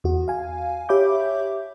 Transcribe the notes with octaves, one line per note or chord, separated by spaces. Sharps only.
E2 F#4
F5 G#5
G4 C#5 E5 B5 D6 G6